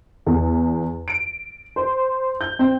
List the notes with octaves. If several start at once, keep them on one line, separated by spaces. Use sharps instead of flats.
E2
D7
C5
G6
C4